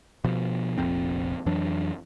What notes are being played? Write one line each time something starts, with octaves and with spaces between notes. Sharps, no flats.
B2 F3
F1 A#1 F2 C4
F2 E3 F#3 D4